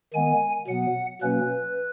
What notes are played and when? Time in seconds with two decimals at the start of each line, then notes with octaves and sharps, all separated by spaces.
0.14 D#3 G#3 B3 G#5
0.68 B2 F#3 B3 F#5
1.22 B2 F#3 A#3 C#4 B4